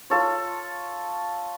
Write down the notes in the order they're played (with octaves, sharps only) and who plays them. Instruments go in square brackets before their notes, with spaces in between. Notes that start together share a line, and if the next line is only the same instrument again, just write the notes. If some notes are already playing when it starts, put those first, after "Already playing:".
[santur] F4 A4 C#5